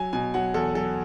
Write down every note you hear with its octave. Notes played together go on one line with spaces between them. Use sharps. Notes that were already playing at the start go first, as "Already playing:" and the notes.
Already playing: F#3 G#5
B2 G#5
F#3 F#5
E2 A4
F#3 A4